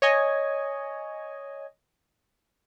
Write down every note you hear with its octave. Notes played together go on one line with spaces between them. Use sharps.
C#5 D#5 G#5